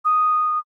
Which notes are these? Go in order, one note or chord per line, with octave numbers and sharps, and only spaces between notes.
D#6